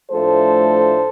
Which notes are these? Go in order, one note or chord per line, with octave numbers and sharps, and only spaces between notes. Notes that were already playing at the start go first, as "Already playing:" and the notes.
A2 F3 A3 D4 A4 C5